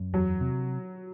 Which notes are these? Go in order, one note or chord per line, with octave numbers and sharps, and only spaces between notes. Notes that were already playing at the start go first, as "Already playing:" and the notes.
Already playing: F#2
E2 F#3
C3